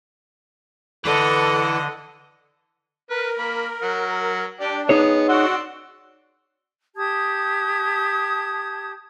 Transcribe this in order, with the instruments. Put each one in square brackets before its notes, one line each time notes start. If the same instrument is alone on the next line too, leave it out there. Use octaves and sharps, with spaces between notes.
[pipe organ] D3 [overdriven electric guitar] E3 [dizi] A4 [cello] D#5 F#5
[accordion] A#4 [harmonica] B4
[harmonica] A#3 B5
F#3 F#5
[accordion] D4 [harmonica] G4 D5
[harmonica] B3 [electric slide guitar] D#4 G#4 C#5
[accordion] F#4 F#5 [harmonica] D5 C6 E6
[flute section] G4 A5 D#6 G#6